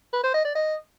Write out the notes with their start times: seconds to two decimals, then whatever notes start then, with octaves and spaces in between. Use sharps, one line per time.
0.13 B4
0.24 C5
0.34 D#5
0.45 D5
0.55 D#5